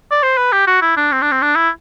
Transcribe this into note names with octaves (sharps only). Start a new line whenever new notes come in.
D5
C5
B4
G4
F#4
E4
D4
C4
D4
C4
D4
E4